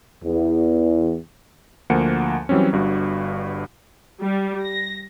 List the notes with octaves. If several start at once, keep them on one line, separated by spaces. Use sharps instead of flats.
E2
D2 F3 A#3 F#5 C#7
E3 F#3 G3 C4 C#4
G1 G2 F#4
G3
A#6